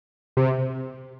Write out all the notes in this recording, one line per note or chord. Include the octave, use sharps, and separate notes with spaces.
C3